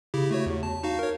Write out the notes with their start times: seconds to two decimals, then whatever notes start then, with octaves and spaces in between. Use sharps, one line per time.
0.14 C#3 E4 G4
0.31 A3 F#4 C#5
0.46 E2
0.63 A5
0.84 D#4 F#4 F5
0.99 A#4 C#5